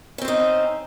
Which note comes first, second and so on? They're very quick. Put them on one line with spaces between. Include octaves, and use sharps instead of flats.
C#4 C4 C5 D#4